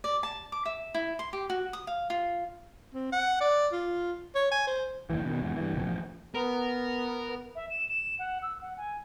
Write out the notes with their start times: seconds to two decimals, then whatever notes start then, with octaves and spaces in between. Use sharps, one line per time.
0.04 D5
0.23 A5
0.52 D6
0.65 E5
0.94 E4
1.19 C6
1.33 G4
1.50 F#4
1.73 D#6
1.87 F5
2.10 F4
2.94 C4
3.12 F#5
3.41 D5
3.72 F4
4.35 C#5
4.52 G#5
4.67 C5
5.10 F#1 D#2 E3
5.25 B2 D#3
5.42 E2 G#2
5.56 G2 E3
5.74 F#1 B1 F3
5.85 A1 F3
6.35 B3 A#4
7.55 E5
7.70 E7
7.89 E7
8.19 F#5
8.42 E6
8.61 F#5
8.77 G#5